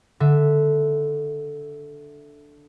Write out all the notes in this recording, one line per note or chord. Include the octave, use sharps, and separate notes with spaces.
D3 E5